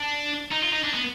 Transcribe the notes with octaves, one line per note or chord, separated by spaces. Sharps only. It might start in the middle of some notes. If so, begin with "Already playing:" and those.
Already playing: D4
D#4
F4
D#4
D4
B3